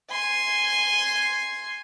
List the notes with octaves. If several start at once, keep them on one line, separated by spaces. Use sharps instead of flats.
G#5 C6